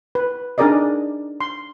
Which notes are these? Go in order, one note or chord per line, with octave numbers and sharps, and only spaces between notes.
B4
D4 D#4 G#4 A#4 D5 D#5
C6